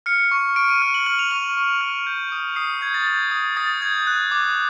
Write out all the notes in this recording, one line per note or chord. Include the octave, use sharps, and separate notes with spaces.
F6 C#7
C#6
C#6 D7
D#7
F6
F#7
F6 F#7
F7
C#6 F#7
C#6
F6
G6
D#6
D#6 C7
G6 G#6
A6
G6 A6
D#6
D#6 A6
G6 G#6
F#6
D6